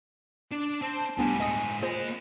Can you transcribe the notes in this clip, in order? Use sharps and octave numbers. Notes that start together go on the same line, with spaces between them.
D4
C4 A5
D2 A2 G3 B3 D4 G#5
A2 G#3 D#5 D#6 C#7
A#3 F4 G#4 C5 D#5